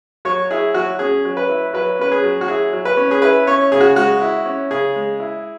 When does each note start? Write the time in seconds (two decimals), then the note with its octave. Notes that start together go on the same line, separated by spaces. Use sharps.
0.25 F#3 C#5
0.51 E4 G#4
0.74 F#3 F#4
0.99 C#4 G#4
1.25 F#3
1.37 B4
1.49 E4
1.73 F#3 B4
1.99 C#4 B4
2.12 G#4
2.24 F#3
2.41 F#4
2.48 E4 G#4
2.73 F#3
2.85 B4
2.97 C#4
3.11 G#4
3.22 E4 B4
3.47 C#4 C#5
3.72 C#3 G#4
3.80 F#4
3.96 G#3 F#4
4.22 E4
4.46 C#4
4.71 C#3 G#4
4.96 G#3
5.20 E4